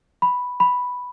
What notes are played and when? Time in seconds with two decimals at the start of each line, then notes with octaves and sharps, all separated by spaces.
0.22 B5
0.60 B5